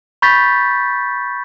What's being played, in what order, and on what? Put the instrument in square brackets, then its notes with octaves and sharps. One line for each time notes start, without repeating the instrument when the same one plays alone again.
[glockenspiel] B5 C#6 G6 A6 B6